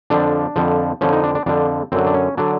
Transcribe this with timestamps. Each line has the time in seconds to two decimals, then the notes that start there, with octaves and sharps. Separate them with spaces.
0.10 F2 D3 F3 D4
0.56 F2 D3 F3
1.01 F2 D3 F3 C#4
1.13 D#4
1.24 D4
1.35 D4
1.46 F2 D3 F3 D4
1.92 F#2 D3 F#3 C4
2.07 D4
2.14 C#4
2.37 D3 F#3 D4